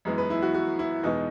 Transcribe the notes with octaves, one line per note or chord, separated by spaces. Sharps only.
F#2 E3 G#3 B3
B4
E4
F#4
F#4
E4
E2 B2 G#3 B3 D#4